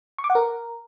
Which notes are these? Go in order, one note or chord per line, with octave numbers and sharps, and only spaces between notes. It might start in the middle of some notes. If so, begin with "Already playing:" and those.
C#6
D6
F#5
A#4